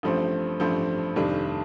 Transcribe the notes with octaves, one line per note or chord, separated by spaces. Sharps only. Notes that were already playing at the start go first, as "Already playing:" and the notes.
A1 G2 F3 A3 C4
A1 G2 F3 A3 C4
F1 F2 D#3 G3 D4